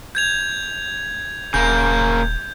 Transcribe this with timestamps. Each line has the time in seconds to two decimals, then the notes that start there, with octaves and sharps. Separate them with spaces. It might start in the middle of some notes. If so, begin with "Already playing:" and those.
0.15 G6 G#6 F7
1.54 D#1 C#3 A#3 G6